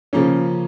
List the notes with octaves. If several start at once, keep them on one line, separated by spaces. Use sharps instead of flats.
C#3 F3 A#3 C#4